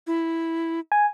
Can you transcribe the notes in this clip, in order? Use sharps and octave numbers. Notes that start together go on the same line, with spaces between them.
E4
G#5